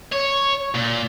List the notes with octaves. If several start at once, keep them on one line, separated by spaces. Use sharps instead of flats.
C#5
A#2